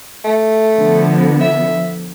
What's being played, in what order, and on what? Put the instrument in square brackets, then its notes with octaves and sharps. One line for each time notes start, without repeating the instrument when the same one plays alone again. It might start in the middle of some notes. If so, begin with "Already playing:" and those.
[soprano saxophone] A3
[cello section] D3 F3 B3
[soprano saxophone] E5